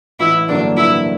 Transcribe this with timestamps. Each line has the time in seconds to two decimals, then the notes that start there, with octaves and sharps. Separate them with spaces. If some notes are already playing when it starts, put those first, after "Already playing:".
0.20 A1 E4
0.48 G2 D3 F#3 A#3 D4
0.77 A1 E4